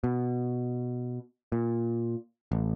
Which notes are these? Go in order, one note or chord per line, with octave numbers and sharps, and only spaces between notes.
B2
A#2
A1